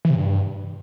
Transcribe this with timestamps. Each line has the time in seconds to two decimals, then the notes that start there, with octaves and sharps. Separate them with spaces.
0.05 E3
0.10 C3
0.16 G2